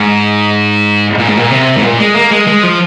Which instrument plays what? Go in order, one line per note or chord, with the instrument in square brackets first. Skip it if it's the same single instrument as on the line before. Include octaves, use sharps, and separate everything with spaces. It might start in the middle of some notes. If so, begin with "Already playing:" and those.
Already playing: [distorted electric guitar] G#2
A#2
G#2
A#2
C3
G#2
A#2
G#3
A#3
G#3
G#3
F3